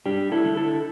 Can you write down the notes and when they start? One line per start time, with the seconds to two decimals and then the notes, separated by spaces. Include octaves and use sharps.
0.06 G3 D4 G4
0.32 E4 A4
0.45 D3
0.57 E4 A4